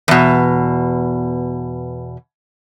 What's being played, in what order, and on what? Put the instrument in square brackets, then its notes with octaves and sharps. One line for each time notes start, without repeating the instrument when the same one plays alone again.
[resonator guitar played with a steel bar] E2 B2